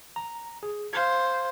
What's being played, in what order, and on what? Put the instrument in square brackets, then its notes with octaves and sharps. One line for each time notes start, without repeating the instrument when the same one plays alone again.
[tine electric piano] A#5
G#4
[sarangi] C5 [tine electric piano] F5 G#6